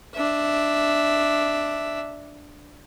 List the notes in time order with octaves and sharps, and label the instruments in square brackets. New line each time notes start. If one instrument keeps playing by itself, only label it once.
[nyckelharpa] D4 E5